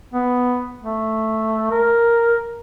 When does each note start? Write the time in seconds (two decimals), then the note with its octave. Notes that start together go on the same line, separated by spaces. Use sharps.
0.13 B3
0.83 A3
1.71 A#4